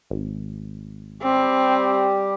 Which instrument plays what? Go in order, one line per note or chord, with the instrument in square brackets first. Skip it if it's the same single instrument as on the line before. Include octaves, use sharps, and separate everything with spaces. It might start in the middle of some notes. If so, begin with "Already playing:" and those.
[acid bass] G#1
[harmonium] G3 G4 [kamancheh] C4